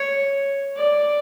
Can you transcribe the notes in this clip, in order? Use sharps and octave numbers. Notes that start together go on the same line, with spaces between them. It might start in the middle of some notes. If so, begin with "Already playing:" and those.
Already playing: C#5
D5